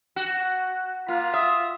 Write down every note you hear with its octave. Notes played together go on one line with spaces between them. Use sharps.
F#4
A#3 F4
E5 D#6